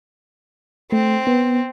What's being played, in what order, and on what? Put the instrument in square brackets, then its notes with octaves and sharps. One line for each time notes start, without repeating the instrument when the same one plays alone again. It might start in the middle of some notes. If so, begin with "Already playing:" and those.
[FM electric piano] A3 [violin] C4
[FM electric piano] B3